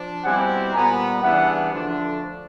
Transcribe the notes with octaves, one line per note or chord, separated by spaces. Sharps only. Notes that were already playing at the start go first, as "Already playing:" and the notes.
Already playing: F3 D4
B2 G3 C4 E4 G4 F#5 G#5
A#2 G3 B3 G#5 A#5
C#3 E3 G3 B3 D4 E5 F#5
D3 F3 A3 D4